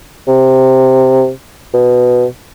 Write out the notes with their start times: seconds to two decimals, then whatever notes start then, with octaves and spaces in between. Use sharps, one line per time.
0.27 C3
1.74 B2